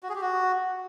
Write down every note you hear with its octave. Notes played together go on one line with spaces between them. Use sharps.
F#4
G#4
G4
F#4